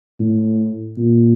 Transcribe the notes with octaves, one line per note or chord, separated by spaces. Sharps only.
A2
A#2